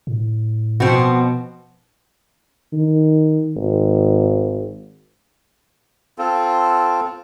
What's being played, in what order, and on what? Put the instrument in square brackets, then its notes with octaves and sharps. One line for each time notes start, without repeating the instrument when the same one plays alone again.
[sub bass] A2
[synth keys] B2 [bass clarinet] F3 [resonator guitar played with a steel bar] C4 F#4
[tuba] D#3
G#1
[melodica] C4 F4 A4